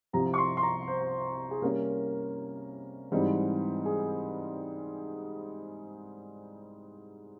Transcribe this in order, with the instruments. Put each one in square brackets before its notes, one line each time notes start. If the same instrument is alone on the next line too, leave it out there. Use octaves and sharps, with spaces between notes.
[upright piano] C2 C3 F3 A#5
C#6
C6
C6
A#5
C5
G#4
C3 G3 A#3 C#4 A#4
G#2 E3 G3 C4
G#4